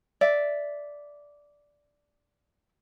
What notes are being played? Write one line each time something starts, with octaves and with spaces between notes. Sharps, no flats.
D5 E5